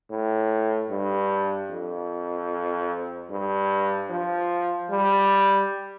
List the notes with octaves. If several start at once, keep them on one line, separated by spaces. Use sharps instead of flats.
A2
G2
F2
G2
F3
G3